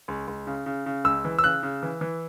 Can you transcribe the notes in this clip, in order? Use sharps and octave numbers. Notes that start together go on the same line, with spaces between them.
C#2
C#2
C#3
C#3
C#3
C#2 E6
E3
E6
C#3 F#6
C#3
E3
E3